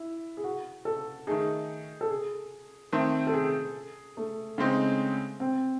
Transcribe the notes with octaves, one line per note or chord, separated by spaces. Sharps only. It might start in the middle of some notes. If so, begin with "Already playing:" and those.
Already playing: E4
G#4
F#4
A4
D#3 A3 D#4 G#4
A4
G#4
D#3 A3 C4
A4
G#4
A3
C#3 G#3 C4 D#4
C4